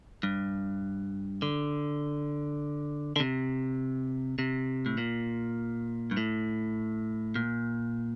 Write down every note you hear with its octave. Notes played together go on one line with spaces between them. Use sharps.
G2
D3
D3
C3
C3
A2
A#2
G2
A2
A#2